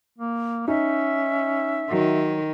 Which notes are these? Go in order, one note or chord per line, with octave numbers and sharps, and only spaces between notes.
A#3
C#4 D#4 E5
D#3 F#3